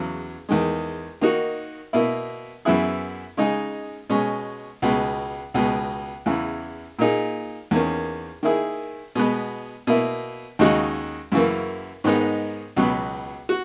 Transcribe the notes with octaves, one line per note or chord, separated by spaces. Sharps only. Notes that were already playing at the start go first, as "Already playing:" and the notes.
Already playing: E2 C#3 F#3
E2 D#3 G#3
D#3 A#3 D#4 F#4
B2 A#3 E4
F#2 E3 B3 E4 G#4
C#3 G#3 D#4 G#4
B2 G#3 C#4
C#2 B2 G#3
C#2 B2 G#3
E2 C#3 E3
A#2 A#3 D#4 G#4
E2 D#3 A#3 C#4
D#3 A#3 E4 G#4
B2 G#3 B3
B2 A#3 E4
D#2 C#3 G#3 D#4 F#4
F#2 C#3 E3 A#3
G#2 D#3 G#3 B3 D#4
C#2 B2 F#3 B3
F#4